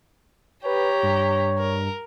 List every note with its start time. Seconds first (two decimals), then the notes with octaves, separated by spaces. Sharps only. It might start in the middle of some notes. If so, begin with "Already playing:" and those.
0.65 G4 B4 C#5 A#5
1.03 G2
1.58 A#4